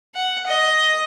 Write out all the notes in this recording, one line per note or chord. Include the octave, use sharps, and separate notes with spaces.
F#5
D#5